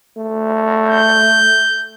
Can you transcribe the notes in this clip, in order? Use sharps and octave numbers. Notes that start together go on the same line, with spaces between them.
A3
G6